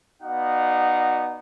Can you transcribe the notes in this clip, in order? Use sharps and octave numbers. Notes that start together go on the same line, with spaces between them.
B3 D#4 F#4 D5 F5 F#5